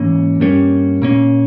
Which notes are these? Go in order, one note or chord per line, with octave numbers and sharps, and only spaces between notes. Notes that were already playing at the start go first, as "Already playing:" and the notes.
Already playing: G#2 E3 A#3 C#4
G2 G3 A#3 C#4
A#2 A#3 C#4